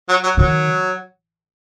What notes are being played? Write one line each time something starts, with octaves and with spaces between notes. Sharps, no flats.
F#3
F#3
D#3 F#3